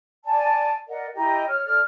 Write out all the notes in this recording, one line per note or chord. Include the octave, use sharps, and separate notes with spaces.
D5 G#5 A5
A#4 D5 D#5 F#5
E4 G4 D#5 A#5
C#5 F6
A4 D5 F6